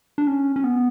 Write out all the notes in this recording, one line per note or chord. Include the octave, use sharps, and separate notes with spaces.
D4
C#4
C#4
B3